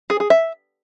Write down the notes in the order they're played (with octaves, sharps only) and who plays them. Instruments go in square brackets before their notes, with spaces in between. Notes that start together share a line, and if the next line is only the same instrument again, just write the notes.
[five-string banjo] G#4
G#4
E5